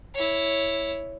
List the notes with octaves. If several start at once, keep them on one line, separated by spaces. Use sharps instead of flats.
E4 C#5